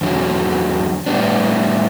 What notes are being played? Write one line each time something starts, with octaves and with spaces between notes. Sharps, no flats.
E2 D3 F#3
A2 G3 B3 D4